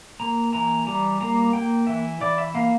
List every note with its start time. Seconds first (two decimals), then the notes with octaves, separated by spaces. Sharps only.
0.20 A#3 A#5
0.53 E3 A#5
0.87 G3 A#5
1.21 A#3 A#5
1.53 A#3 G5
1.87 E3 E5
2.20 E3 D5
2.38 E5
2.54 A#3 F5